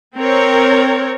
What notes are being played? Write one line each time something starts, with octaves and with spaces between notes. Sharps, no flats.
C4 A#4 C#5